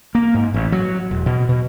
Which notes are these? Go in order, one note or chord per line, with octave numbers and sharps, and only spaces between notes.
A#3
G#2
A1
F#3
E1
B2
B2